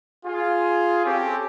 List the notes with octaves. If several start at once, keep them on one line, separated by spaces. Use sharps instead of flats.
F4 G#4
C4 C#4 G4 A4